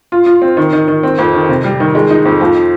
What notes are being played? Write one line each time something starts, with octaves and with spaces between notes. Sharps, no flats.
F4
F4
C4
D#3
D#3
D#3
C4
F2
D#3
C3
G3
D#3
G#3
D#4
F2
F3